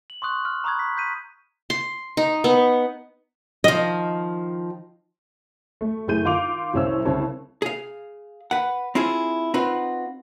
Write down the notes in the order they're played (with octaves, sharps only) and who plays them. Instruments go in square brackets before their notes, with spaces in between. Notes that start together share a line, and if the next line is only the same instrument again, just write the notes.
[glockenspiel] F#7
C6 C#6 D#6 F#6
F6
A#5 B5 C#6 D#6 F#6 G#6
B6
G6 B6 D#7
[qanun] C6
D#4
B3
[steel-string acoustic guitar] D#3 F3 [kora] D#5
[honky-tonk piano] A3
F#1 A2 A3 G#4 G6 D#7
D#3 F4 F5 C6 D6 F7
C2 A2 C3 C#4 C5 E6
C2 C#3 C4 C#5 A5
[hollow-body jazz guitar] G#4 F5
B4 F#5
C4 E4 F4 G#4
C4 D#4 F4 F#4 B4